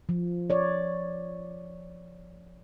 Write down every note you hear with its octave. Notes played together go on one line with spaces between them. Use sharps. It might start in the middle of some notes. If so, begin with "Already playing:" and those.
F3
C#5 D5